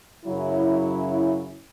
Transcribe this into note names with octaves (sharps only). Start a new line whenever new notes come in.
F#2 C#3 F#3 C#4 E4